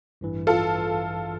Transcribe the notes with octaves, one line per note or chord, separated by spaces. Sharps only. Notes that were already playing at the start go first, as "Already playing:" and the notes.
A1 G2 E3
F4 A4